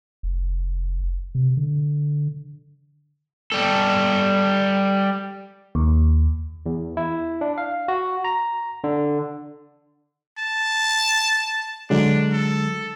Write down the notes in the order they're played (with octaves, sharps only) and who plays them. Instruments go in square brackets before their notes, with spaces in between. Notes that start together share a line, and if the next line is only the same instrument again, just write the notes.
[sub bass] F1
C3
D3
[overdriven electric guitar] G3 A4
[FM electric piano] D#2
[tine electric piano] E2
E4
D4
F5
F#4
A#5
D3
[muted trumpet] A5
[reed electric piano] D3 F#3 G#3 [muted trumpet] D4
[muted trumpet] A4